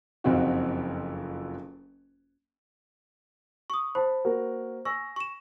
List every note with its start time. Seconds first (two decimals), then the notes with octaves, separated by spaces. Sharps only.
0.24 F#1 F2 C4 D#4 F4 F#4
3.70 C#6 D#6
3.95 C5 A5 B5
4.25 A#3 F#4 A#4
4.85 G#5 C#6 E6 A#6
5.16 C#6 E7